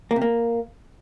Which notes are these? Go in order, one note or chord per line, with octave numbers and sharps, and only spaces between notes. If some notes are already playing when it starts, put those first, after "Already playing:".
A#3
C3
A#3